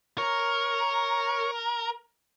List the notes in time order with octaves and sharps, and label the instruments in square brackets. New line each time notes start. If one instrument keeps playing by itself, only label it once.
[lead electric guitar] A#4 [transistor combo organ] C#5 C#6